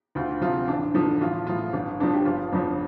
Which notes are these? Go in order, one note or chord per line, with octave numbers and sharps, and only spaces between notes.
D2 F4
C3 F3 F4
A1 D4
G2 D3 F3 D4
A1 F4
A2 F3 F4
G1 D4
G2 F3 D4
G4
G1 F4
F2 F3 D4